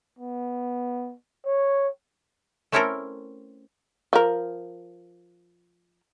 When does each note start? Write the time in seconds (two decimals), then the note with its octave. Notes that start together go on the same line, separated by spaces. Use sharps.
0.19 B3
1.46 C#5
2.72 A3 C4 C#4 E4 A4 A#4
4.13 F3 A#4